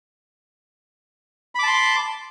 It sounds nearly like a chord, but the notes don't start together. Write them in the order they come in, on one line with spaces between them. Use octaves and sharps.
B5 D6 A5 C6